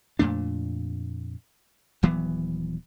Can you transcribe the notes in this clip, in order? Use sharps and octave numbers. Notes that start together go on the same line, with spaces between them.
F2 A#2 A3 D4
D#1 E3 F#3 B3